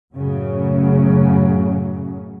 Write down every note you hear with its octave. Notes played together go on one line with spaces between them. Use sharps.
F#2 A2 C#3 F#3 C#4